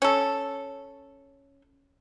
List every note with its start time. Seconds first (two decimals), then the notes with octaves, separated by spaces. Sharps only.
0.02 C#4 A4